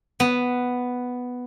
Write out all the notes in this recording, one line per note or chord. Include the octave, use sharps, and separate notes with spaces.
B3